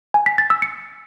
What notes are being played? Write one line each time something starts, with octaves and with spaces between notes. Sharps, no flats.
G#5
B6
A6
E6
C#7